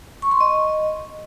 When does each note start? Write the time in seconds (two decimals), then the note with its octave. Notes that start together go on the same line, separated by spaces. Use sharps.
0.22 C#6
0.31 C6
0.41 D#5